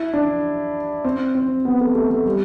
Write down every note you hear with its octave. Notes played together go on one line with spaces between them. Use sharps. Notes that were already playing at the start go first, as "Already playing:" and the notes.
Already playing: E4
D4
C4
C4
B3
A3
A3
A3
G3